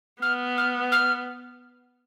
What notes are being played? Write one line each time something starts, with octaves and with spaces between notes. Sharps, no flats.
B3 F6
F6
F6